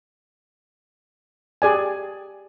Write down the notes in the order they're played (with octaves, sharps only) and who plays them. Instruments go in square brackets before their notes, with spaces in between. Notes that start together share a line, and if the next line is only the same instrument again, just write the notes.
[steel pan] G4 G#4 D5 G#5